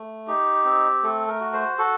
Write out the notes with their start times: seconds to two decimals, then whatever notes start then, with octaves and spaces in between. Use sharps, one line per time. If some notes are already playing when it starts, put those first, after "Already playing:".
Already playing: A3
0.27 D#4 G4
0.65 C4
1.03 A3 A4
1.28 A#4
1.41 F#4
1.53 C5
1.78 F#4 A4